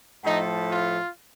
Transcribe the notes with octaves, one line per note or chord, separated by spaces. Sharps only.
A2 F3 A3 D#4
F4